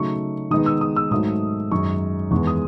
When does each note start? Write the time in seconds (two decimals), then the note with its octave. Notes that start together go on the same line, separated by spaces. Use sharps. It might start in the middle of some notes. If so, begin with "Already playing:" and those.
Already playing: C#3 F#3 A3 D#4 C#6
0.51 D#3 G#3 B3 D#4 D#6
0.66 E6
0.81 D#6
0.96 E6
1.11 G#2 F#3 A3 D#4 D#6
1.71 F#2 D#3 G#3 D#4 C#6
2.31 E2 D#3 G#3 B3 C#6
2.47 D#6